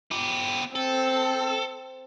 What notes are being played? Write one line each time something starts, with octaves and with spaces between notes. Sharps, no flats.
B3 G4
C4 A4